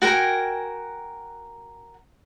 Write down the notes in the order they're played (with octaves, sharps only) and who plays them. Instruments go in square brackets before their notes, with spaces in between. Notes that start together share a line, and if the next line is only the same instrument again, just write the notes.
[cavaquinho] F#4 A#4 G5 G#5